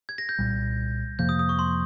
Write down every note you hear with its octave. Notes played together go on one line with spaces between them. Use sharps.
G#6
A#6
G6
C2 A#2 G3
F2 C3 F3 A#3 G6
D#6
D#6
C#6
C6